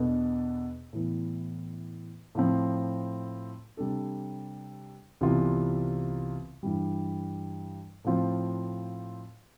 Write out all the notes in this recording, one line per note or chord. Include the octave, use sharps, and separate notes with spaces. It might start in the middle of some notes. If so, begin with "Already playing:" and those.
Already playing: E2 B2 B3 D4 A4
A2 E3 B3
A2 F3 C4
C3 G3 D4 A4
C2 C3 E3 B3 F4
G2 E3 G3
A2 F3 C4 F4